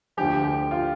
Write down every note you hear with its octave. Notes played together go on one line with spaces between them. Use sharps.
D2 D3 F3 G4
G4
F4